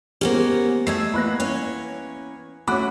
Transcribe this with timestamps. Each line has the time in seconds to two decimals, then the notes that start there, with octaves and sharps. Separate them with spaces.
0.21 A#3 B3 C#4 G4 G#4 C5
0.87 A3 D#5 E5 G#6 C7
1.14 E3 A#3 B3 B5 F#6 A#6
1.40 C#4 C#5
2.68 A3 C#4 F#4 B5 D6 F#6